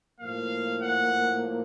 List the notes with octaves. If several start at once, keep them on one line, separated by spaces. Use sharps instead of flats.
A2 F3 A#3 F5
F#5